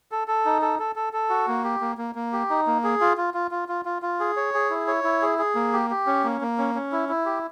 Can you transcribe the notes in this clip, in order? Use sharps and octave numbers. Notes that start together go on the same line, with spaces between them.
A4
A4
D#4
A4
A4
A4
A4
F#4
A#3
G4
A#3
A#3
A#3
G4
D#4
A#3
G#4
F4
F4
F4
F4
F4
F4
F4
G#4
C#5
G#4
E4
C#5
E4
G#4
G#4
A#3
G4
G4
C#4
A#3
A#3
C#4
C#4
E4
E4
G4